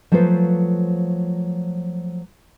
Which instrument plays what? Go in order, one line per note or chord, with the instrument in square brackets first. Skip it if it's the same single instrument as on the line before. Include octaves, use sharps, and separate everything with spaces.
[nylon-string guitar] F3 F#3 A3 F4 B4 C5